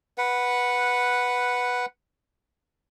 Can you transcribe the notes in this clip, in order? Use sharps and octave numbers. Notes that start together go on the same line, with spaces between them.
B4 F#5